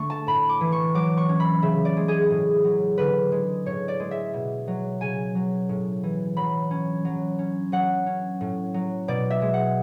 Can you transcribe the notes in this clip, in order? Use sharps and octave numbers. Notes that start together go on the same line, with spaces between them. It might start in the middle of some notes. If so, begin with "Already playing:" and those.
Already playing: D3 A3 C#6
A5
A2 B5
D6
E3
C#6
F#3 D6
C#6
C#4
B5
C#3 E5
D5
G#3
G#4
A2
F#3
D3 B4
G#3
A2 C#5
D5
G#3
E5
B2
F#3
C#3 G#5
F#3
A2
E3
F#3 B5
C#4
F#3
C#4
F#3 F#5
C#4
A2
F#3
B2 D5
E5
G#3
F#5